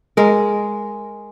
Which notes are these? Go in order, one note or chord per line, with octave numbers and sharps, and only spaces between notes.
G#3 A#4